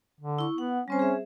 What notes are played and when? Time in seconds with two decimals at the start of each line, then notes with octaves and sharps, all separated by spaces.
0.21 D3
0.39 E4 C#6
0.58 B3 F#5
0.88 G3 C4 C#4 C5
0.99 G#4 E5